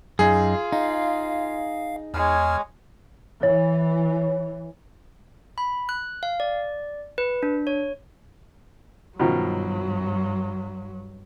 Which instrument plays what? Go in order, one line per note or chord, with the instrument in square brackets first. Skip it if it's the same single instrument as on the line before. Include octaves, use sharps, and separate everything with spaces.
[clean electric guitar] F#2 D#4 [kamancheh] F4 [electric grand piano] G#4
[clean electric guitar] D#4 [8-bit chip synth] F5
[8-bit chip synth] E2 F6 [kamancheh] G#3 C#5
[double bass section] E3 [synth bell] C#5
[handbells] B5
F#6
F5
D5
B4
D4
C#5
[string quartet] G2 F#3 [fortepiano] B2 D#3 F3